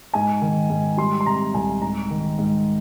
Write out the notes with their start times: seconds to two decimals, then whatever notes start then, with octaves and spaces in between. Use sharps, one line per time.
0.14 G#2 G#5
0.42 D#3
0.70 G#2
0.98 G3 C6
1.21 C6
1.26 C3 A#5
1.54 C2 G#5
1.82 G#2 A#5
2.10 D#3
2.38 G#2